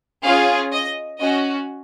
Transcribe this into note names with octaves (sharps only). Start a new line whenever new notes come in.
C#4 F4 G#4 F5
D#5
C#4 F#4 D#5